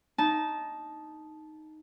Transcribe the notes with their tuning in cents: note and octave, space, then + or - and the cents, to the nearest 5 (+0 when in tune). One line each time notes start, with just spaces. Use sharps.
D#4 +0 A5 -15